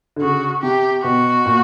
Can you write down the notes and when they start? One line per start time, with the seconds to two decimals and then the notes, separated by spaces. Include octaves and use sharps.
0.16 D3
0.22 C#3 F#4
0.62 C3 G4
1.04 B2 F#4
1.46 A#2